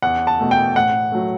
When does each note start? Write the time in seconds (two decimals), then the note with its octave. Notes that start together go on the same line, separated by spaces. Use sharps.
0.02 E2 F#5
0.27 A5
0.39 B2 A3
0.51 G5
0.76 A2 F#5
1.12 F#3 A3